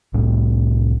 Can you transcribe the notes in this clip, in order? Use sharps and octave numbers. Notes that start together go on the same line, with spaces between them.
C2 A2 G3 C4